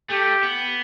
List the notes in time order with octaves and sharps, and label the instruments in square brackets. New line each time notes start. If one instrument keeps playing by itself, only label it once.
[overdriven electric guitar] A3 [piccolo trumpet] G4
[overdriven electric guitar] B3